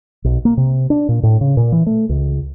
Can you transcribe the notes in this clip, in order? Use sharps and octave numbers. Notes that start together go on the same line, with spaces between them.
B1
A#3
C3
D4
A#2
A2
C#3
A#2
E3
A3
C#2